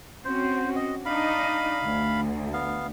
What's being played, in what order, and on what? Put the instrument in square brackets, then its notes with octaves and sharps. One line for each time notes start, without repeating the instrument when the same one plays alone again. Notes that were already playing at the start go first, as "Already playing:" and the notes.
[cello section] C4 C#4 F#4 [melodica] C5
[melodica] D#5
[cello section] D4 D#4 D#5 [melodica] F5 B5
[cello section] D2
[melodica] B3 F5